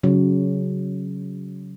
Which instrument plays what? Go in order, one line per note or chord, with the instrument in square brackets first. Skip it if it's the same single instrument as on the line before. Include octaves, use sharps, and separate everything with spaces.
[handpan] C#3 F#3